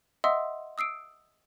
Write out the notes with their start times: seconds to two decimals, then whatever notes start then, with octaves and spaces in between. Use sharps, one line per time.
0.24 D#5 E5 F#5 C6 D#6 E6
0.78 D#6 E6 C7 D7